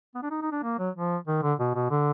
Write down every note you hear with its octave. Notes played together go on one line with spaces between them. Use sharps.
B3
D4
D#4
D#4
D4
A#3
F#3
F3
D#3
D3
B2
B2
D3